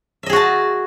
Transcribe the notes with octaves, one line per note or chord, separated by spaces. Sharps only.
F#4 G#4 D#5 E5 A5